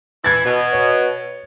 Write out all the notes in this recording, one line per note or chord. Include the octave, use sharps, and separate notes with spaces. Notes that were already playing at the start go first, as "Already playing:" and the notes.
E3 E4 G#6 A6
B2
C#5